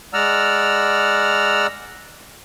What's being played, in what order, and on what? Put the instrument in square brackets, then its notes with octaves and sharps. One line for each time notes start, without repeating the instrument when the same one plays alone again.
[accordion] G#3 D5 F#5 A#5 E6 F6